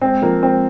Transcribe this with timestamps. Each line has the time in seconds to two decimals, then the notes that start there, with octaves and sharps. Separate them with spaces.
0.01 G#3 C4
0.22 F3 A#3
0.42 G#3 C4